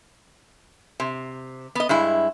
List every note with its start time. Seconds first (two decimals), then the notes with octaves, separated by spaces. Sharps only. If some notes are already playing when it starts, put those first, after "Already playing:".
1.00 C3
1.75 B3 D#5
1.89 G2 G#3 E4